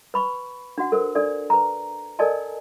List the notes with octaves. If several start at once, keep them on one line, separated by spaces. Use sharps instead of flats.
B4 B5 C#6
D4 F#4 F#5
F#4 A4 A#4 C5
D4 A4 D5
B4 A#5
A4 A#4 D5 D#5 G#5 A5